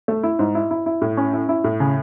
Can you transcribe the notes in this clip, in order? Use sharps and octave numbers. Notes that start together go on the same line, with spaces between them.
A3
E4
G#2
E4
E4
E4
A2
C#4
E4
E4
A2
C#3